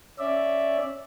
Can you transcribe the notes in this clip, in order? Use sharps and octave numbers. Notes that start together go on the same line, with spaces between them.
C#4 D5 E5